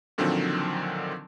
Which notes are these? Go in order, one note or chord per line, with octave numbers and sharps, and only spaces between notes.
A#2 D3 D#3 F3 F#3 C4